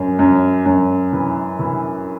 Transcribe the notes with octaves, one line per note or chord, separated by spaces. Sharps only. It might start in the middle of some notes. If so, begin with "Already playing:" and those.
Already playing: F#2
F#2
F#2
E3
E3